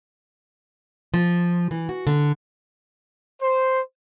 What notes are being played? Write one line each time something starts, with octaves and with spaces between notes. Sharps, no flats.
F3
E3
F#4
D3
C5